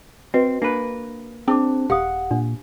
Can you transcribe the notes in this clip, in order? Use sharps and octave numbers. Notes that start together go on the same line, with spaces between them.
C4 F#4 B4 D#5
A#3 D4 B4
C4 D4 G#4 D6
D#1 G4 F5 F#5 D#6
A#2 D4